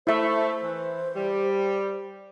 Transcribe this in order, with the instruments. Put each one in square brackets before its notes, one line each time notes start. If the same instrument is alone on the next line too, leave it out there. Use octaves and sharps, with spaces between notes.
[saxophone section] A3 [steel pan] E4 E5 [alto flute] C5
[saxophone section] E3
G3